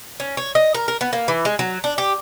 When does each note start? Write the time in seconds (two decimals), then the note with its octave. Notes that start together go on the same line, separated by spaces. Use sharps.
0.20 C#4
0.37 C#5
0.55 D#5
0.74 A#4
0.88 A#4
1.01 B3
1.13 A#3
1.28 E3
1.45 G#3
1.59 F#3
1.84 D4
1.98 G4